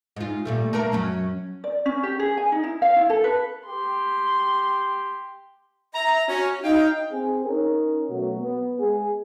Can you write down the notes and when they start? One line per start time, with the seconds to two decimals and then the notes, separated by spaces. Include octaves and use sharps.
0.16 G#2 F4
0.45 A#2 G3 A3
0.73 A3 A#3 A#4
0.92 F#2 F#3 C#4
1.64 D5
1.86 C#4
2.03 G4
2.19 G#4
2.37 G#5
2.52 D#4
2.64 E4
2.82 F5
2.96 E4
3.10 A4
3.24 B4
3.66 G4 C6
5.94 E5 A#5
6.28 C#4 F#4
6.63 D#4 F5 G5
7.12 C4 G#4
7.45 C#4 D#4 A#4
8.10 B2 F#3 A3 F#4
8.40 B3
8.80 G#3 G#4